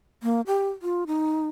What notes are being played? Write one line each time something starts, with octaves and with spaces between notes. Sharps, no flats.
A#3
G4
F4
D#4